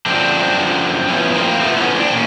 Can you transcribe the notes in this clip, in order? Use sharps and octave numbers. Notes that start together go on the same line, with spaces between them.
F#2 D3 F3 C4 D4
F#2 D3 F3
A2 F3 B3 C#4
B3
A#3 C4
A2 F3 A3 B3
B3 C#4
C4 D4
A#2 C#4